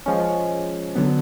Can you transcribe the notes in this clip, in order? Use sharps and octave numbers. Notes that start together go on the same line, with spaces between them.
F3 G#3 C#4
D3 F#3 B3